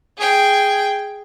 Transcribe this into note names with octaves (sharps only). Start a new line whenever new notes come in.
G#4 G5